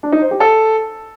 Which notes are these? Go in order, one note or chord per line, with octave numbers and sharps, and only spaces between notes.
D4
D#4
C5
G4
A4